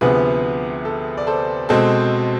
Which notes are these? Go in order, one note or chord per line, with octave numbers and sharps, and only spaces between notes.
D2 C3 F3 B3 G#4 B4
A4
D5
A4 C5
B2 G#3 C4 A4 C5